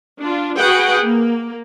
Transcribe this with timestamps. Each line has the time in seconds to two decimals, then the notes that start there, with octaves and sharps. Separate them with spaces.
0.20 D4 F4
0.57 F#4 G#4 B4 F#5 G5
1.00 A#3